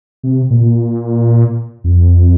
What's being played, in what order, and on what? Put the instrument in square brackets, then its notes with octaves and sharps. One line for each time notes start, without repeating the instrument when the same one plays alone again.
[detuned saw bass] C3
A#2
F2